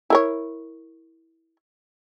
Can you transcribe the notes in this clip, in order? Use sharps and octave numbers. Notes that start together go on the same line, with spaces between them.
E4 A#4 C#5